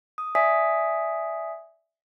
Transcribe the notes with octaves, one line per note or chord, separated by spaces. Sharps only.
D#6
D5 E5 G#5 D#6 B6